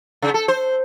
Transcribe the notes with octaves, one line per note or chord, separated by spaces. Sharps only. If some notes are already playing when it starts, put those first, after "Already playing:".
C#3
A4
C5